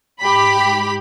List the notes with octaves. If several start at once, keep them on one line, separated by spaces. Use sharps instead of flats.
G#2 G4 B5